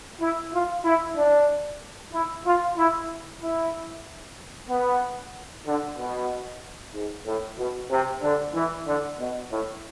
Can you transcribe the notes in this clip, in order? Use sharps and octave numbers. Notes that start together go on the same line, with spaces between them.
E4
F4
E4
D4
E4
F4
E4
E4
B3
D3
B2
G#2
A2
B2
C3
D3
E3
D3
B2
A2